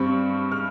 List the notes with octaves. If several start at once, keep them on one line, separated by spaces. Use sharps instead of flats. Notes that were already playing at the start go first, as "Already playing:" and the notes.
Already playing: G2 G3 C4 C#6
F6